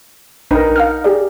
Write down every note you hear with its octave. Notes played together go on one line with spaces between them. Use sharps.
B1 D#4 A#4 B4 G5
F5 F#5 F6
G4 G#4 D5